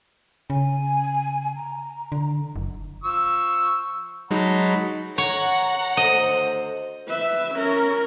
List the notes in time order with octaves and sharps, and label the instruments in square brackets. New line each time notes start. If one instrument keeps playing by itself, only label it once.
[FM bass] C#3 [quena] G#5
[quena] A#5
[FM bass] D3
F#1
[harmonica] F3 C#6 E6
[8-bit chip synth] F#3 G#3 D#4 [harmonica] F#5 A5 B5
[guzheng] C#5 [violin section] F#5 A#5
[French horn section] D2 A4 C5 [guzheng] D#5
[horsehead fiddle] B4 E5
C#4 A#4